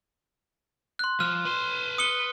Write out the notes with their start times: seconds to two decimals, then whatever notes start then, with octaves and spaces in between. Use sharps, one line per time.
0.99 C6 F#6
1.20 F3 F6
1.45 B4 C6
1.98 D#6 C#7 G7